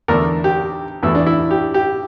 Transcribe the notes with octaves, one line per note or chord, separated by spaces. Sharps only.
E2 D3 A3 D4 A#4
G4
E2 E3 A3 E4
D4
E4
G4
G4